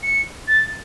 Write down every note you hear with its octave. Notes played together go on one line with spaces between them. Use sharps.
C#7
A6